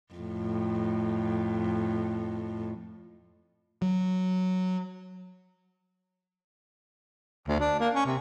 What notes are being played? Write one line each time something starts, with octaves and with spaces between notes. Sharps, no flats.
F2 A2
F#3
D2
D4
A#3
C#4
C3